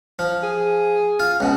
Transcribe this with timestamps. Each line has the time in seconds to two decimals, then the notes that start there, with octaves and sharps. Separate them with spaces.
0.19 F3
0.43 G#4
1.20 F4
1.40 C#2 B2